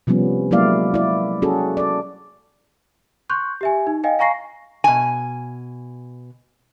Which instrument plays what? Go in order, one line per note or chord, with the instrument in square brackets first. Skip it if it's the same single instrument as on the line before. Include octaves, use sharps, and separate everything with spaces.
[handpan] C3 F3 G3 B3 C#4
F#3 G#3 A#3 E4 D5 F5
E4 D5
C#4 F#4 G#4 A4
A4 D5
[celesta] C6 C#6 F#6 G6
G4 E5 G#5
D#4
D#5 F5 G5 G#5
F5 G#5 A#5 C#6 A#6 C7
[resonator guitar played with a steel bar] B2 G#5